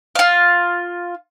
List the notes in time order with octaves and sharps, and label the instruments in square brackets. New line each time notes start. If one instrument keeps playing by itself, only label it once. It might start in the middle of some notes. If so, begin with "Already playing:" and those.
[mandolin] F4 F5